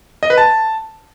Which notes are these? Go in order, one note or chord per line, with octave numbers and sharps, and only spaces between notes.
D#5
B4
A5